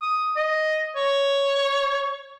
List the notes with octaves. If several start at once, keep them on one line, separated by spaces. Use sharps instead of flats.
D#6
D#5
C#5